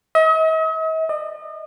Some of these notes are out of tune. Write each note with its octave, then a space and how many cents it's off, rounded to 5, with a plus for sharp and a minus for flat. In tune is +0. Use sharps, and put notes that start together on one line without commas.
D#5 +45
D#5 -40